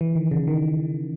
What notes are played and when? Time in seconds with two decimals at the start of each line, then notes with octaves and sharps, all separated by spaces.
0.01 E3
0.15 D#3
0.31 C#3
0.47 D#3